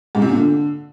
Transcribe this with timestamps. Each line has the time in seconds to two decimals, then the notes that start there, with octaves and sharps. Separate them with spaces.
0.15 G#2
0.22 C3
0.29 A#2
0.36 D3